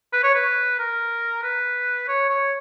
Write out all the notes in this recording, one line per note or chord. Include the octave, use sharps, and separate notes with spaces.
B4
C#5
B4
A#4
B4
C#5
C#5